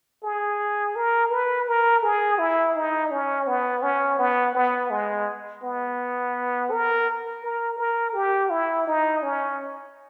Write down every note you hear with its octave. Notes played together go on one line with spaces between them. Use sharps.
G#4
A#4
B4
A#4
G#4
E4
D#4
C#4
B3
C#4
B3
B3
G#3
B3
A#4
A#4
A#4
G4
E4
D#4
C#4